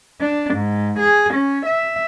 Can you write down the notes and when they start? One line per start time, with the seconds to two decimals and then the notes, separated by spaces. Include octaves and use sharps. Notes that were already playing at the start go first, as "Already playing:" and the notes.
0.21 D4
0.54 G#2
0.99 G#4
1.34 C#4
1.66 E5